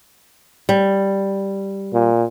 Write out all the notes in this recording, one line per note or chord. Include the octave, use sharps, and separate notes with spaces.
G3
A#2